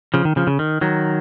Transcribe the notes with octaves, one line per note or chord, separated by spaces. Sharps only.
C#3 F3
D#3
C#3 F3
C#3
D#3
D#3 F#3